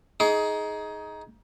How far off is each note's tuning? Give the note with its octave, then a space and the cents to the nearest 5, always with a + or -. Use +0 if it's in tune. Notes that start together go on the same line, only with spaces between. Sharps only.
D#4 +15 G#4 +20 D6 -45